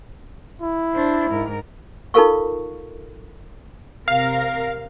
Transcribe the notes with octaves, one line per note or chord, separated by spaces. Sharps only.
E4
D4 C5
G#2 A#4
D#4 F4 A4 A#4 F5 C#6
C3 A#4 F5